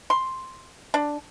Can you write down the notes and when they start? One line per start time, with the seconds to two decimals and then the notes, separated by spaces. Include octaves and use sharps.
0.10 C6
0.94 D4